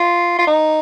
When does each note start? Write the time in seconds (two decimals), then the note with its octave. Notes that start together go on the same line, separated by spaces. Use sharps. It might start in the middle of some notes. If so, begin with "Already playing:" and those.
Already playing: F4
0.38 F4
0.47 D#4